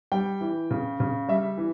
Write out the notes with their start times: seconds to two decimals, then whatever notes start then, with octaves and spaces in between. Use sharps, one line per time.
0.12 G3 G5
0.41 E3
0.71 C#3
1.00 C#3
1.28 G3 E5
1.58 E3